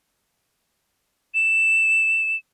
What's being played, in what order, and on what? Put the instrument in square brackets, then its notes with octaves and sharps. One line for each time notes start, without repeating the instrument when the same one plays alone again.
[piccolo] E7